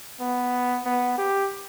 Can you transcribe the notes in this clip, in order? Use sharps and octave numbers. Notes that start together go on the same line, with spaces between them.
B3
B3
G4